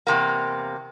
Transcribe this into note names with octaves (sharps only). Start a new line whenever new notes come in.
E2 C3 A#3